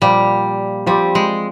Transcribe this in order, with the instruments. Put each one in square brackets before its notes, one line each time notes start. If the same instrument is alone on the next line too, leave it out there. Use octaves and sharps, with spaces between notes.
[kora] A#2 F3 A#3 [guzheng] G3
[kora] F3 C4 G4 [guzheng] G3
[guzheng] G#3